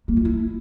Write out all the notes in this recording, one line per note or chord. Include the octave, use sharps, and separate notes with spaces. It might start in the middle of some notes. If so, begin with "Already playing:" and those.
A#3
F4
E4